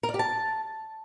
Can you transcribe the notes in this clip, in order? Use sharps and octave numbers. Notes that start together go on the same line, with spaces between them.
A#4
D5
G4
A5